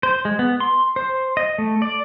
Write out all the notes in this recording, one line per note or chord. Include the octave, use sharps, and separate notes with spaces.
C5
G#3
B3
C6
C5
D#5
A3
D5